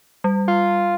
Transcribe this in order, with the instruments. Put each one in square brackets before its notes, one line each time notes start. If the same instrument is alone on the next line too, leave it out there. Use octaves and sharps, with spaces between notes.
[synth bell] G3
[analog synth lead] F4